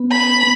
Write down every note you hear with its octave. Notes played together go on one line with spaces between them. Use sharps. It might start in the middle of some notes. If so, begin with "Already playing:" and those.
Already playing: B3
B5